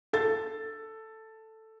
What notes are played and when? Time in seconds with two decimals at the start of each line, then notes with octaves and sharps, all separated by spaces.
0.13 A4 A6